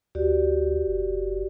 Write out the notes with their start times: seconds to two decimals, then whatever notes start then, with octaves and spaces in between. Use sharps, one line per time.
0.15 D2 F#4 G4 D5
0.87 F#1